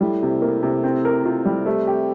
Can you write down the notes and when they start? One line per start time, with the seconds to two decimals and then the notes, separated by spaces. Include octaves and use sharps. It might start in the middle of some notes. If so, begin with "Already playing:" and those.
0.01 A2 G3
0.22 C3
0.42 A#3
0.63 C3
0.84 C4
1.05 A#4
1.25 F4
1.45 G3
1.66 C3 A3
1.87 G4